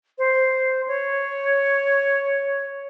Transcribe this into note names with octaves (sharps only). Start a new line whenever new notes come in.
C5
C#5